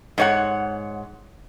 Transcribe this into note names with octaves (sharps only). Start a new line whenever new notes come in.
G#2 C#5 F#5